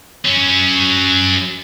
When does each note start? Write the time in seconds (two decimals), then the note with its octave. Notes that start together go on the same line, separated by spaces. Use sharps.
0.25 F#3 C#4